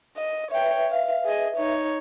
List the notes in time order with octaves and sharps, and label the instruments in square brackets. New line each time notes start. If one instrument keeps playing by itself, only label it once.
[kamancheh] D#5
[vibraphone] B4 E5 [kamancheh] C#5 G5
[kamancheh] F5
G#4 D#5
D#4 C#5